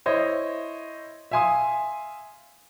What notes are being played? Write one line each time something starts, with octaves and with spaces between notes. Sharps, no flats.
E4 C5 C#5 D#5
E5 F5 G#5 C6 D#6